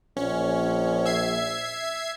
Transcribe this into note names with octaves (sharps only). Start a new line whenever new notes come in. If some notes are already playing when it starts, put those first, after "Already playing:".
A#1 C#4
E5 G#6 C7